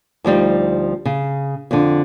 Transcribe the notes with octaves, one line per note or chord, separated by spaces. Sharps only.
D2 F3 G3 D#4
C#3
F2 D3